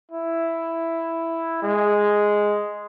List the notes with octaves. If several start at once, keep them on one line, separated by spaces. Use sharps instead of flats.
E4
G#3